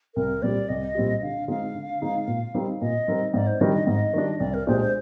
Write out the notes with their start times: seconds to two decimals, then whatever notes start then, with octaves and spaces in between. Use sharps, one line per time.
0.15 C2 A#4
0.42 A#2 G3 C4 G4 D5
0.69 C2 D#5
0.95 A#2 G3 C4 G4
1.22 D3 F5
1.48 G#3 C4 D#4 F5
1.75 D3
2.01 G#3 C4 D#4
2.27 A#2
2.54 G3 C4 D#4 A#4
2.81 A#2 D#5
3.08 G3 C4 D#4 A#4
3.34 G#2 D5
3.47 C5
3.61 D#3 G3 D4 D#5
3.73 D#5
3.87 G#2 D#5
4.13 D#3 G3 D4
4.40 C2 D5
4.54 A#4
4.67 A#2 G#3 D4 G4 C5
4.81 C5